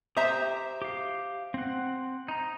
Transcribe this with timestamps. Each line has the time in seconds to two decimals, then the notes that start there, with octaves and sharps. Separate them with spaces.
0.17 G4 C5 E5 A#5 D#6
0.82 G4 F5
1.54 C4 F#5
2.28 D#4 A#5